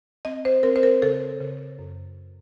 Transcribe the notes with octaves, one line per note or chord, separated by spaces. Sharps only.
C4 D#5
C5
C4 A#4
C5
A#4
C#3 A4
C#3
F#2